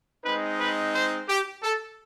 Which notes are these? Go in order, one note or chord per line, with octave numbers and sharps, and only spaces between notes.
G#3 C4 D#4 B4
B4
C5
G4
A4